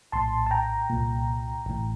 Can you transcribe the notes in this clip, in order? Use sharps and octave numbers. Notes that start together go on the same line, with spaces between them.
A#1 A2 A5 C6
A5
G5 A#5
C2 A#2
A1 A2